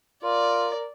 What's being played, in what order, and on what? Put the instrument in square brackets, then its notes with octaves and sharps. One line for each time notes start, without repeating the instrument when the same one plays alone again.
[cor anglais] F4 [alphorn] A#4 [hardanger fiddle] D5